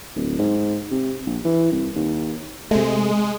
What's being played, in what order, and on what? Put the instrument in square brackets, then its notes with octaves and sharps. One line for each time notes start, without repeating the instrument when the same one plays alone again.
[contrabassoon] D1
G#2
C3
A#1
E3
C2
D#2
[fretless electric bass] C3 A3 [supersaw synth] G#3